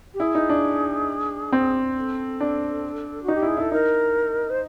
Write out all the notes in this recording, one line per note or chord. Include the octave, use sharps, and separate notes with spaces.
G4
E4 G#4
D#4
D4
C4
A4
D4
F#4
D#4
G4
E4 G#4
E4 A4
D#4 A#4
C5